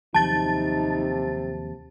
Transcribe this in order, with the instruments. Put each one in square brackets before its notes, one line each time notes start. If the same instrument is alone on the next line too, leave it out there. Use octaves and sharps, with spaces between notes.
[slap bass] D#2 F3 F#3 [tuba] C3 [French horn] D#4 [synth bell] A5 A6